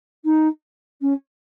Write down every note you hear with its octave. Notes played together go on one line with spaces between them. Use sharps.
D#4
C#4